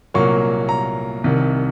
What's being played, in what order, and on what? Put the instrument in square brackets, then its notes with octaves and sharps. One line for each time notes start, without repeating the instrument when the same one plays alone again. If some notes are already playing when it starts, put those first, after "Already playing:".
[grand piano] C2 A#2 F#3 A#3 C#6
A#5
C2 C3 D#3